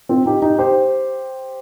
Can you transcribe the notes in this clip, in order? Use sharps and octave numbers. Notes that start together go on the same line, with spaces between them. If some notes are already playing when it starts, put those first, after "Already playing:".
C4 F4
D#4 G4
D#4 G4
G4 C5